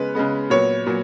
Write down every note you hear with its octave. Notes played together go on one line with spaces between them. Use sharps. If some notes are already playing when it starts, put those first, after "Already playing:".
Already playing: C#3 G#3 B3 B4
C#3 G#3 B3
A#2 F#3 B3 C#5
A#2 F#3